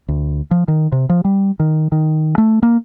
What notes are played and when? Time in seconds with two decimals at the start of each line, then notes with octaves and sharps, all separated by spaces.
0.08 D2
0.51 F3
0.68 D#3
0.92 C3
1.09 F3
1.25 G3
1.60 D#3
1.92 D#3
2.38 A3
2.63 A#3